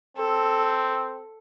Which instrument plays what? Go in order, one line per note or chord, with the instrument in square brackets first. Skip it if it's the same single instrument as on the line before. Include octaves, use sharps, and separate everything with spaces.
[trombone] C4 [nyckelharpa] A4